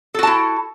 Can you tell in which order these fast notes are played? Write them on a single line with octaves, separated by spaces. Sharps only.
A4 F#4 A5 E4